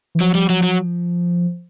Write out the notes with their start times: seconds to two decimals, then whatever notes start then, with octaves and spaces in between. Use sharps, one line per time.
0.15 E3
0.20 F3 F#3
0.35 G3
0.50 F#3
0.63 F#3